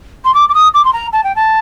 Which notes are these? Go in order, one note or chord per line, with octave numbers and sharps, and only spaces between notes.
C6
D6
D6
D#6
D6
C6
A#5
A5
G5
A5